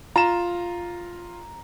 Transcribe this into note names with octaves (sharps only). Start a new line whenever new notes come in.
F4 A#5 E7